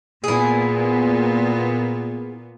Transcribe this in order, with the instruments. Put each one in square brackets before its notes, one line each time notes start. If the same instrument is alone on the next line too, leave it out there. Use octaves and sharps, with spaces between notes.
[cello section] A#2 B3 [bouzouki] E4 G#4